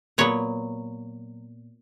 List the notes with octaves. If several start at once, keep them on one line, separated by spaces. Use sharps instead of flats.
A#2 F#3 B3 C#5